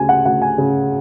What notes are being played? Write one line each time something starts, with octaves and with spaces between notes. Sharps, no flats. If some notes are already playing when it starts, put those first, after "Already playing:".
Already playing: D2 C#3 G#5
F#5
D2 F#5
G#5
C#3